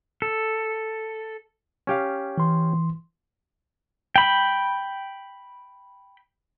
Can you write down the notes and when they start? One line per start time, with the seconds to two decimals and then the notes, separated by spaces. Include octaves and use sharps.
0.22 A4
1.87 C#4 G4 F5
2.38 E3 C6
4.16 G5 B5